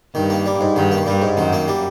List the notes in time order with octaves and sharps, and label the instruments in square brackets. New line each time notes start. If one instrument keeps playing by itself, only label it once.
[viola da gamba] G2 [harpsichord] D#3
[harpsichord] A#3
G3
G#2
[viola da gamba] G2 [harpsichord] D#3
[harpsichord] A#3
[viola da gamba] G2 [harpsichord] G3
[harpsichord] G#2
[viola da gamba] F#2 [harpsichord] D#3
[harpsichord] A#3
G3